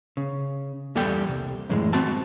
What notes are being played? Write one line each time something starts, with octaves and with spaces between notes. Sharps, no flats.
C#3
E2 G3 A#3 A4 G5
C2
F#2 A2 E3 G#3
C4 F#4 A5